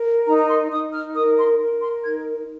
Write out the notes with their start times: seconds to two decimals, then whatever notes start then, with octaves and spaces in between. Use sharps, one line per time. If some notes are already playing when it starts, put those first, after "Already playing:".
Already playing: A#4
0.27 D#4 A#5
0.38 A#5
0.48 C6
0.71 D#4 D#6
0.94 F6
1.15 A#4 D#6
1.38 C6
1.60 A#4
1.82 C6
2.04 D#4 G#6